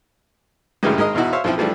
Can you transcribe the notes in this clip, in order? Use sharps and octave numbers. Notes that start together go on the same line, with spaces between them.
F#2 A2 C#3 E3 G3 G#3
G#1 G#3 A#4 D#5
E2 B2 D#4 E4 F#4
C5 C#5 E5 F5
B1 F3 C4 E4
E3 F3 G3 A3 D4